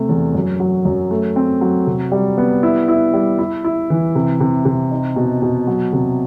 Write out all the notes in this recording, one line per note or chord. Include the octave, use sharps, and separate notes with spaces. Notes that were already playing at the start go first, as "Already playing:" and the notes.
Already playing: C3 A3
E2
F#2
F#3
F#2
A3
C4
F#3
C3
G3
B3
E4
E4
G3
E4
E4
E3
C3
C3
C3
D#4
B2
B2
F#3
C3